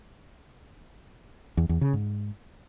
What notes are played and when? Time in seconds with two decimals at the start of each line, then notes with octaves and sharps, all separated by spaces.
1.57 E2
1.69 E2
1.81 C#3
1.93 G#2